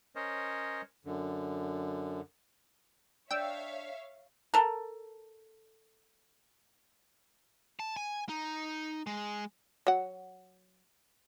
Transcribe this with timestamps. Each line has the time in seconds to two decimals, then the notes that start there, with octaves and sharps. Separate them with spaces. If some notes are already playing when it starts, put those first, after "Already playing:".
0.16 C#4 A#4 C5 C#5 D#5
1.05 F#2 D3
3.31 D4 C#5 E5 F5 G5 E6
4.54 A4 A#4
7.80 A5
7.97 G#5
8.29 D#4
9.07 G#3
9.87 F#3 F#5